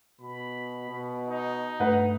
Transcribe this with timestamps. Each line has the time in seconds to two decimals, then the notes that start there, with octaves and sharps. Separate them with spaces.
0.20 B2 B5
0.90 B2
1.27 D#4
1.80 G2 A3 B4 F#5